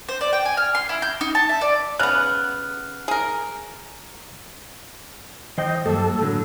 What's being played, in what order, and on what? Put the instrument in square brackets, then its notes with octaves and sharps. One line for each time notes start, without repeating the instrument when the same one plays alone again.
[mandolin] C5
D5
G5
G#5
F6
C6
E4
G6
D#4
A5
E5
D5
[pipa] C#3 B3 [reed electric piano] F6 F#6
[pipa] G#4 A#4
[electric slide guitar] E3 C5 G5 [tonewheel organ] D#5
[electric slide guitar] G2 F#3 A#3 [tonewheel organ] A4
[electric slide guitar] A2 D3 F#3